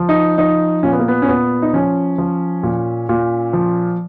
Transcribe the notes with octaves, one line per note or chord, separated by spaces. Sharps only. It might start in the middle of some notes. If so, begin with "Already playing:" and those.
Already playing: F3
D#4
F3 D#4
A#2 C#4
B3
A#3
B3
C#4
A#2 B3
D#4
F3 C#4
F3
A#2
A#2
F3